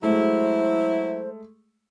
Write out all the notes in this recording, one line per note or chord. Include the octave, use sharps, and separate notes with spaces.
F#3 G#3 A3 E4 C5